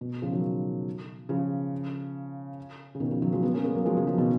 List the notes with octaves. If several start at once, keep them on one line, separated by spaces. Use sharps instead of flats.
B2
C#3 F3
D#3 F#3
C#3 F3
C#3
B2 D#3
C#3 F3
D#3 F#3
F3 G#3
G#3 B3
A#3 C#4
G#3 B3
F#3 A#3
F3 G#3
C#3 F3
C#3 F3
B2 D#3